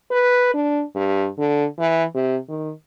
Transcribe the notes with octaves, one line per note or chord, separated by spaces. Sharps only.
B4
D4
G2
D3
E3
C3
D#3